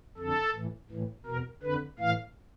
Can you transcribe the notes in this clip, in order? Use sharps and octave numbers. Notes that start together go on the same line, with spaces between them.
F2 D3 A4
A2 E3
A2 E3
E2 B2 A#4
F2 D3 B4
A2 E3 F5